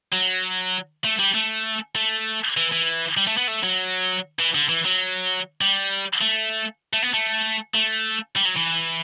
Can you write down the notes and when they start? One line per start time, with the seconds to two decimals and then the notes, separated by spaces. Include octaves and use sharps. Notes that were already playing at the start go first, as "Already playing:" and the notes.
0.12 F#3
1.04 A3
1.19 G3
1.34 A3
1.96 A3
2.57 E3
2.72 E3
3.17 G3
3.27 A3
3.37 B3
3.48 A3
3.63 F#3
4.39 E3
4.55 D3
4.69 E3
4.85 F#3
5.61 G3
6.21 A3
6.93 A3
7.03 B3
7.13 A3
7.74 A3
8.36 G3
8.45 F#3
8.56 E3